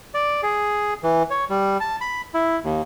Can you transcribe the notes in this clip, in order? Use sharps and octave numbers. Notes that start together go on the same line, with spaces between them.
D5
G#4
E3
C#5
G3
A5
B5
E4
D#2